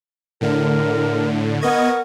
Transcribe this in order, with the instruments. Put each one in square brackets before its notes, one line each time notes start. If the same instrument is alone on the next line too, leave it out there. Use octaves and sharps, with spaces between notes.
[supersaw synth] A2 D3 [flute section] A#4
[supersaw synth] B3 D#5 G#6 [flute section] A#4 F#5 C#6